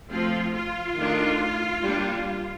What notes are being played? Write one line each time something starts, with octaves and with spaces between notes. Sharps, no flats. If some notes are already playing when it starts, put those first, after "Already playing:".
F3 A3 C4 F4
F4
D#3 A3 D4
G3 A#3 D4